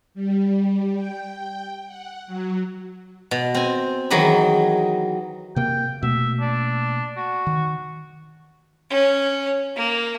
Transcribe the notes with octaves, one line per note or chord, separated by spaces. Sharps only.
G3
G5
F#5
F#3
B2
C4 G#5
D#3 E3 F#3 G#4 D#5 B5
C3 A#3 G5
B2 A3 A#3 E5
D4
F#4
D#3
C#4
A#3